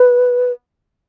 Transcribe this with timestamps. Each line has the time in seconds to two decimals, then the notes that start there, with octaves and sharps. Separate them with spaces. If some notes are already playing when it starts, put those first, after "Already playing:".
Already playing: B4